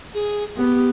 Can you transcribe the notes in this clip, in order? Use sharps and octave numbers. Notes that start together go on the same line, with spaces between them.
G#4
B3 G4